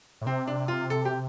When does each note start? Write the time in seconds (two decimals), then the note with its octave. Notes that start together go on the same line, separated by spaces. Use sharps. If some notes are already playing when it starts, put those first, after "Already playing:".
0.22 A2
0.26 C3 C4
0.48 D4
0.68 F4
0.90 A4
1.05 G4